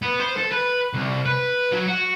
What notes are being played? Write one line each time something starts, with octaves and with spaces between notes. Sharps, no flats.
B3
C5
A4
B4
C2
B4
F#3
F#4